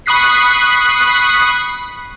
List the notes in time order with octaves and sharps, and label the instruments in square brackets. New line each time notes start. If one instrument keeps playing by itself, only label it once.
[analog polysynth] B5 C#6 D#6 F#6 B6 C7